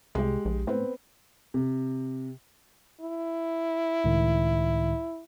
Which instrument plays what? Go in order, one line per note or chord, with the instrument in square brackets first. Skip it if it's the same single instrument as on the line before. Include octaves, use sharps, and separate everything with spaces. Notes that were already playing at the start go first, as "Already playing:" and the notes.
[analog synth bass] C2 [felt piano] G#3 G4
[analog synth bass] A#1
[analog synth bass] A2 [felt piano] B3 C4
[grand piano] C3
[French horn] E4
[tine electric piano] C#2 A2 D#3